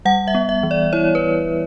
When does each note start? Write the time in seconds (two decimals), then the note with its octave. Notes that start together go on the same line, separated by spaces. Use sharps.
0.05 G3 F#5
0.28 E5
0.35 B3
0.49 E5
0.63 E3
0.71 D5
0.93 E4 C#5
1.15 B4